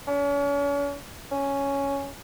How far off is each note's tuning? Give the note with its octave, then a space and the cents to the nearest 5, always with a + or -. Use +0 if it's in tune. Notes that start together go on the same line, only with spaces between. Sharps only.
C#4 +40
C#4 +5